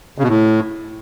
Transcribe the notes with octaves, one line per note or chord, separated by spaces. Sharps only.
C#3
B2
A2